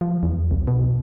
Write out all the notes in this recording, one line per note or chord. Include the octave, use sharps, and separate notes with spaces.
F3
E2
C2
B2